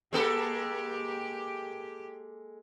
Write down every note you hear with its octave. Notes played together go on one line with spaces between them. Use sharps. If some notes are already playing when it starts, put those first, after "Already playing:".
G#3 A#3 G4 A4